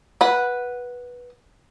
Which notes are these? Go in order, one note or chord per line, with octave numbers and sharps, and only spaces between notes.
B4 F#5